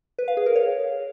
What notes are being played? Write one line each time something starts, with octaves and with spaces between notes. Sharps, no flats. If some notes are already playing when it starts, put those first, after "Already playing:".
B4
F5
G#4
A#4
C#5